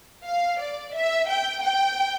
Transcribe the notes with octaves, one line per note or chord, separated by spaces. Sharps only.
F5
D5
E5
G5
G5